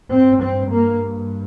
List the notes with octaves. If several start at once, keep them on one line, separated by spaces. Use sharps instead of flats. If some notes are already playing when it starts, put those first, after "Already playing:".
G2 C4
C4
A#3